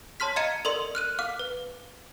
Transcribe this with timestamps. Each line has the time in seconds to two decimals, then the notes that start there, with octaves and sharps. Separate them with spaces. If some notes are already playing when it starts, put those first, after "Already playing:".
0.20 C#5 A5 C6 F6 B6
0.36 D#5 F5 A#5 G#6 C#7 D#7
0.65 A4 A#4 D5 C6 F#7
0.95 F6 F#6 D#7
1.19 F5 D6 F6
1.39 B4